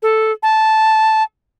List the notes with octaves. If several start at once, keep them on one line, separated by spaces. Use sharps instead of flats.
A4
A5